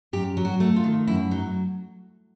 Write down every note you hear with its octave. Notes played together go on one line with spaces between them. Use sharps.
F#2 G4
F#3
F#4
A3
F4
D#3
F#2 E4
F#3 D#4